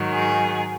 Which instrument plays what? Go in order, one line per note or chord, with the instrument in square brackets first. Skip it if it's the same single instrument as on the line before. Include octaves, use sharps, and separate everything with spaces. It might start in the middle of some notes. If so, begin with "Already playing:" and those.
Already playing: [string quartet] G#2 D#3 F#3
G#4